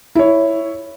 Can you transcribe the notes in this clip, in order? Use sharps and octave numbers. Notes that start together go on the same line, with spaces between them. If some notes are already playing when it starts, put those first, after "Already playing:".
E4 C#5